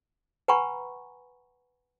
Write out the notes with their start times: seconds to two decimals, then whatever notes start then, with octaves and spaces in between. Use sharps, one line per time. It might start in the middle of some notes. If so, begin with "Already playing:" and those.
0.48 B4 F#5 G#5 A#5 B5 C#6